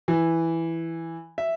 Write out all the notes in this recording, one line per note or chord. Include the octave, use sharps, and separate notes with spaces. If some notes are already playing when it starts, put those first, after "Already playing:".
E3
E5